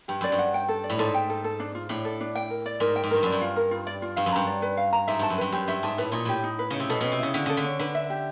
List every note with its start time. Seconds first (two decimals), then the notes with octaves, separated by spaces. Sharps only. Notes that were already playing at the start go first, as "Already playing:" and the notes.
0.08 G2 G4
0.21 F#2 D5
0.32 G2
0.39 F#5
0.54 G5
0.68 A4
0.84 D5
0.90 A2
0.99 G#2 A4
1.14 G5
1.30 A4
1.44 A4
1.60 D4
1.75 F4
1.89 A2 D4
2.05 A4
2.20 D4
2.35 G5
2.50 A#4
2.66 D5
2.80 G#2 A#4
2.96 G5
3.04 G#2
3.11 G2 A#4
3.23 F#2 D5
3.32 G2
3.41 F4
3.56 A#4
3.71 F4
3.87 D5
4.02 F4
4.16 G2 F5
4.26 F#2
4.32 G2 A#5
4.47 D5
4.62 B4
4.77 F5
4.93 A#5
5.08 G#2 E5
5.19 G2 A5
5.30 F#2
5.38 G2 B4
5.52 F#2 G4
5.68 G2 E5
5.83 G#2 A5
5.98 A2 B4
6.12 A#2 D#4
6.25 A2 G4
6.44 D#4
6.59 B4
6.70 C#3 D#4
6.80 C3
6.89 B2 A4
7.01 B2 C#4
7.12 C3
7.19 C#3 E4
7.34 D3 C#4
7.46 C#3 A4
7.57 D3
7.64 C#4
7.79 D3 B4
7.95 E5
8.10 G4